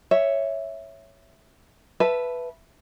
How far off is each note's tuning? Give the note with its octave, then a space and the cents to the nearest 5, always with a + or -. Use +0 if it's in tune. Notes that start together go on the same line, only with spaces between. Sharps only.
C#5 +0 E5 +0
B4 +0 E5 +15 A5 +0